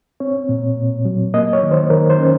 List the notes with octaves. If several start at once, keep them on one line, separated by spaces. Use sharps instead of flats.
C4 C#5
A#2
A#2
F#3
A#3 D#5
C#5
D#3
C5
D#3 A#4
C5
C#4